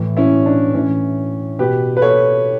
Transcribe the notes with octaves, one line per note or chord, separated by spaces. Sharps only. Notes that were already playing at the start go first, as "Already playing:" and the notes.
Already playing: A2 E3
C#4 E4
D4
A2 E3 C#4
B2 G4 B4
B4
A4 C#5